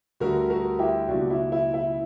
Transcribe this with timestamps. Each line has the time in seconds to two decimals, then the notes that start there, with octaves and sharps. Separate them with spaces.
0.20 D2 D3 G3 F#4 A#4
0.50 F#4 A#4
0.79 E4 G4
1.08 C#2 B2 F#3 A#3 D4 F#4
1.30 E4
1.52 E4
1.74 E4